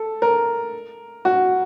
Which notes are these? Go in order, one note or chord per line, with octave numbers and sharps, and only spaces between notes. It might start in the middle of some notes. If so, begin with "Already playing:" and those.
Already playing: A4
A#4
F#4